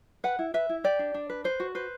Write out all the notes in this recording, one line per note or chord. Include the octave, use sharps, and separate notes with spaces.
B4 F#5
E4
B4 E5
E4
G4 D5
D4
D4
B4
B4 C5
F#4
B4 C5